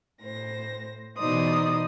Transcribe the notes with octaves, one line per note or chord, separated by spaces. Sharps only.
A2 C5 A#6
B2 E3 D#4 C5 D5 D#6